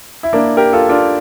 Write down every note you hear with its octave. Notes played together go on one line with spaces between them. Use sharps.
E4
A#3 D4
G4 A#4
F4 A4
D4 F4